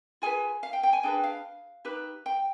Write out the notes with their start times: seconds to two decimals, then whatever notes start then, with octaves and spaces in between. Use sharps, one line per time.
0.22 F4 G#4 B4 G#5
0.63 F5
0.73 G5
0.83 G5
0.93 G#5
1.03 D4 G#4 B4 G5
1.24 F5
1.85 D#4 G4 B4
2.26 G5